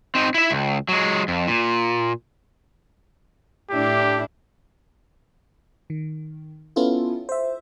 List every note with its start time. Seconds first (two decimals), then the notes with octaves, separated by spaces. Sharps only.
0.15 C4 D#4
0.34 E4 E5
0.51 C#2
0.89 F#3 G#3
1.28 F2
1.48 A#2
3.70 A2 D4 E4 G4
5.90 D#3
6.76 B3 C#4 E4 F4 A4
7.29 C5 E5